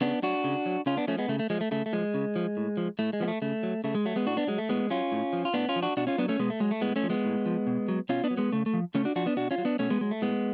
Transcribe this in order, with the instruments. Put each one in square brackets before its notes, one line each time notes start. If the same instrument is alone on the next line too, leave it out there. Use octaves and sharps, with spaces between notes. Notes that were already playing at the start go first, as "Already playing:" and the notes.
[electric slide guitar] C#3 B3 D4
F#3 D4 F#4
C#3
F#3
C#3 C#4 F4
B3 D4
F3 A3 C#4
G#3 B3
C#3 A3
A3
F3 G#3
A3
C#3 A3
A3
F3 G#3
C#3
F3
A2
F3
A2 A3
G#3
F3 B3
A3
C#3 A3
F#3
C#3 A3
G#3
F#3 A3
G#3 B3
A2 D4 F#4
B3 D4
F#3 G#3
A3
A2 G#3 B3
F#3 C#4 F4
A2
F3
F4
A2 B3 D4
C#4 F4
F3
D4 F#4
B2 D4 F#4
C#4 F4
F#3 B3 D4
A3 C#4
B2 G#3 B3
A3
F#3 G#3
A3
A2 G#3 B3
A3 C#4
F3
G#3 B3
A2
F3
B2
F#3
B2 C#4 F4
B3 D4
F#3
G#3 B3
C#3 A3
A3
F3
C#3 A3 C#4
D4 F#4
F3 D4 F#4
B3 D4
B2 D4 F#4
C#4 F4
F#3
B3 D4
B2 A3 C#4
G#3 B3
F#3 G#3
A3
A2 G#3 B3